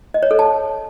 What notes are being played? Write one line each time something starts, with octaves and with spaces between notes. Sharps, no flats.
D#5
C#5
A4
A5